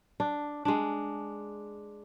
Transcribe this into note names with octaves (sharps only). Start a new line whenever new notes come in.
D4
G#3 D4